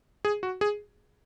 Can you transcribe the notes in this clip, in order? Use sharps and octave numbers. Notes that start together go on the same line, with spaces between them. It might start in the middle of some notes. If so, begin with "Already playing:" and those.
G#4
F#4
G#4